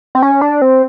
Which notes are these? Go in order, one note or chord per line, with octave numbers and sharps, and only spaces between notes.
C4
C#4
D4
C4